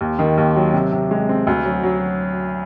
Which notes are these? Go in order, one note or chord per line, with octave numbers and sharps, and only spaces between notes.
D#2
D#3
D#2
F#3
C3
C3
G#3
C4
D2
F#3
F#3